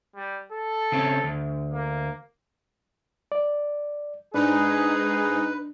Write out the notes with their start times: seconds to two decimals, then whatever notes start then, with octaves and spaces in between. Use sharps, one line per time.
0.15 G3
0.52 A4
0.92 C#3 C4 C#4
1.24 D2
1.73 A#3
3.32 D5
4.34 G#2 D4 D#4 G#4 B4